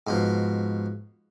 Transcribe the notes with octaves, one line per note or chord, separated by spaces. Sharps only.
G#2 B2 F3